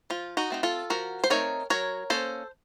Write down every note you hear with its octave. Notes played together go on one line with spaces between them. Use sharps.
F3 F4
D#4 F#4
A3 C4 D#4
F4 A4
F3 F#4 A#4
C5
A3 C4 D#4 A#4 C#5
F#3 A#4 C#5
A#3 C#4 A4 C5